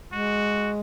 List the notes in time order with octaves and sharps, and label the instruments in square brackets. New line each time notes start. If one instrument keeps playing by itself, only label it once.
[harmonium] G#3 [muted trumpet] F#4